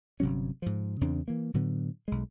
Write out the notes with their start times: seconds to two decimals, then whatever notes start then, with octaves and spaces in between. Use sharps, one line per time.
0.20 G1 C3 F#3 C#4
0.62 G#2 F3
1.01 E2 C#3 C4 D4
1.28 E3 A#3
1.54 A2 D3 F#3 B3
2.08 B1 G#3